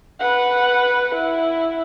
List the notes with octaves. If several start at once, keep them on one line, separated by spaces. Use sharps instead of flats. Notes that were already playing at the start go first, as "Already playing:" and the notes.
B4 F#5
E4